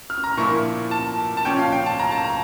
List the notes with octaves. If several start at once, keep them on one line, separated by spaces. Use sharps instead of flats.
F6
A#5
A#2 F3 A#3 E4 C#6
A5
A5
A#2 F3 C#4 G5
F5
G5
A5
A#5
A5
A#5